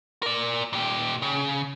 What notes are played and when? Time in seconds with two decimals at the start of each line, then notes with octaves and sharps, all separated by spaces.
0.23 A#4 D5
0.73 A#2 G4
1.22 C#3